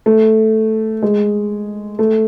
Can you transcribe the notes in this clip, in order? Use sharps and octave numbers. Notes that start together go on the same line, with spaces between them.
A3
G#3
A3